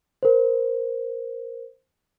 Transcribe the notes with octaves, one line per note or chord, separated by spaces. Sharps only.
A#4 C5